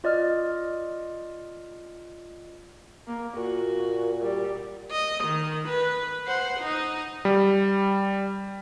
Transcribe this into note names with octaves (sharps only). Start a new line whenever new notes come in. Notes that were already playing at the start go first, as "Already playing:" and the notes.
F4 D5 D#5 F6
A#3
A#2 F#4
G3
D#5
D#3
B4
C5 F#5
D#4 D#5
G3